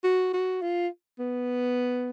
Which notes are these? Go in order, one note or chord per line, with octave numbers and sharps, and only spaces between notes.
F#4
F#4
F4
B3